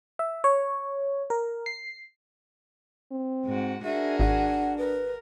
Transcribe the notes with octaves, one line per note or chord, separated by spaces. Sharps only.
E5
C#5
A#4
C7
C4
G#2 F#4
D4 F#4 G#4 A#4 E5
G#1 F#5
A#4 B4